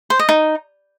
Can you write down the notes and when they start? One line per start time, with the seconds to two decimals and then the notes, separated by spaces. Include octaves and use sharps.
0.10 C5
0.19 D#5
0.29 D#4